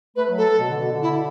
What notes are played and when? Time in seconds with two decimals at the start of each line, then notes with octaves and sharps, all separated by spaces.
0.16 A3 B4
0.30 F#3
0.38 A4
0.59 B2
0.70 D3
0.80 B2
0.91 D3
1.02 E4